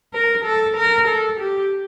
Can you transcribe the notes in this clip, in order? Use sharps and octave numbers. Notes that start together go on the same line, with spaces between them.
A#4
A4
A#4
A4
G4